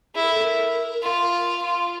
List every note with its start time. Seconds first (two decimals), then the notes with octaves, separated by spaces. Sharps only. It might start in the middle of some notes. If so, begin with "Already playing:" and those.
0.15 E4 G#4
0.22 A#4
0.29 A4
0.44 A#4
1.03 F4
1.63 F4